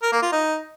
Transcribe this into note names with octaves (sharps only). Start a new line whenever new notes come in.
A#4
A#3
F4
D#4